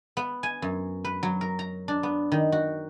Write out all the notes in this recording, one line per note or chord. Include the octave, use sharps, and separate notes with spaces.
B3
G#5
F#2
B4
F#3
A#4
A#5
D4
B3
D#3
F#4